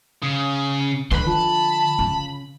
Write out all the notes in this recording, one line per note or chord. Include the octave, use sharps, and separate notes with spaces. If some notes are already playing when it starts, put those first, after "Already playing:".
C#3
D3 B4 B5 C6
F3 A5
C#3